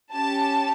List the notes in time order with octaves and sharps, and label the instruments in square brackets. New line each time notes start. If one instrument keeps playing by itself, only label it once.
[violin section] C#4 G4 A5